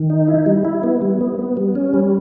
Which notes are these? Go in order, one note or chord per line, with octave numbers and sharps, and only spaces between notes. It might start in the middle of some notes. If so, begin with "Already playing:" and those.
Already playing: D#3
D#4
E4
G3
E4
B3
G3
B3
B3
G3
C#4
G3